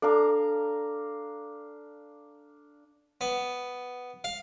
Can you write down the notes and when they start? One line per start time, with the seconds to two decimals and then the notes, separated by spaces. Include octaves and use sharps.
0.02 D4 A4 F5 A#5
3.21 B3
4.24 F5